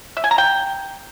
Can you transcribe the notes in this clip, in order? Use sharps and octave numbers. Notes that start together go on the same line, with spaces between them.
E5
G#5
A#5
G5